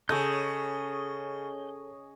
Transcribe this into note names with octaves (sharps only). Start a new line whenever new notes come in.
C#3 G#4 A4 C#5 D#5 G6